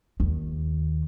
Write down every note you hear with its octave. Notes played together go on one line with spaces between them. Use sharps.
D#2